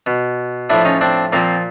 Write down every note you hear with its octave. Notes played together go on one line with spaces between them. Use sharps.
B2
A2 F3 D4 E4
C#4 D#4
C4 D4
A#2 F3 A#3 C4